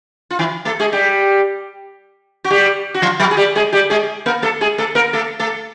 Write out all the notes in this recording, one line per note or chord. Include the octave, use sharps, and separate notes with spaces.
F4
E3 E4
A3 A4
G#3 G#4
G3 G4
F#4
G3 G4
F#4
F3 F4
F#3 F#4
G#4
G3 G4
G#3 G#4
G3 G4
G#3 G#4
A#3 A#4
A3 A4
G#3 G#4
A3 A4
A#3 A#4
A3 A4
A3 A4